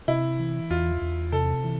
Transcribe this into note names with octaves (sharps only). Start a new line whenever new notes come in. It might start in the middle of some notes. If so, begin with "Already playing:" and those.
C3 E4
E3
E2 F4
E2
C3 A4
E3